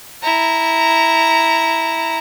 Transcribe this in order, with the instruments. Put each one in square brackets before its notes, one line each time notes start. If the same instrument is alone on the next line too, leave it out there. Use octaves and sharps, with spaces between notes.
[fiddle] E4 A#5